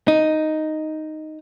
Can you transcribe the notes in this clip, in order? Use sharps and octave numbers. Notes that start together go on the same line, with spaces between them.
D#4